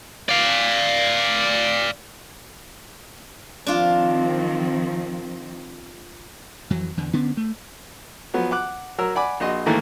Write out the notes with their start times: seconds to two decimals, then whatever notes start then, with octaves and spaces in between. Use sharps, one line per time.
0.29 D5 F5
3.67 D#3 F3 C4 D4 F4
6.70 F2 E3 F#3
6.97 E2 D3
7.13 D3 B3 C#4 D4
7.37 A3
8.34 F3 F#3 B3
8.51 F#5 D6 F#6
8.98 F#3 A#4 E6
9.16 D5 F#5 G#5 B5 D6
9.40 A#1 F#4 D#5 C6
9.66 G#2 D#3 E3 A3 A#3